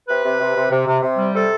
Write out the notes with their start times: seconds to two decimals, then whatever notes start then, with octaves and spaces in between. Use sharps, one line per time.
0.08 C3 B4
0.25 C3
0.40 C3
0.56 C3
0.71 C3
0.87 C3
1.02 C3
1.18 G3
1.34 C3 A4